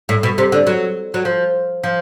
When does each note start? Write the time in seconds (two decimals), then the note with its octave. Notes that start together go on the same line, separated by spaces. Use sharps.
0.09 A2
0.23 B2
0.38 C3
0.52 D3
0.67 F#3
1.14 F#3
1.25 F3
1.83 F3